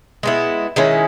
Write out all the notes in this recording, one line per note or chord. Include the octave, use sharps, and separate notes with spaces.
G#3 B3 E4
D#3 G#3 C#4 E4